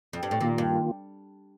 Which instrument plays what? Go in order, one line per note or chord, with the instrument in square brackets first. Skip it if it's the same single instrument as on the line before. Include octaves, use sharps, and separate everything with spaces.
[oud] F2
G2
A2
[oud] A#2 [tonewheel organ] D#3 A#3 F4
[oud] G2